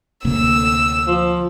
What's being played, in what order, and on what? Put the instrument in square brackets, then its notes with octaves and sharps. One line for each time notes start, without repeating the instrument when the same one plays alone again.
[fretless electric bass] D2 C3 A#3 [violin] E6
[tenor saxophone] F3